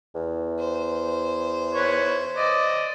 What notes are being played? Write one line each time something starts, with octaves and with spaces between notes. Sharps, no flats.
E2
C5
B4 C#5
D5 D#5